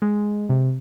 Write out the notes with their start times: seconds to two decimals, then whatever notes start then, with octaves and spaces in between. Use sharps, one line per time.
0.02 G#3
0.49 C3